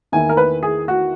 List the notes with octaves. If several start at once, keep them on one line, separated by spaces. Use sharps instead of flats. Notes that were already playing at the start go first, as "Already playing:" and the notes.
E2 D#3 A#3 E4 G#5
A#4
B4
G#4
F#4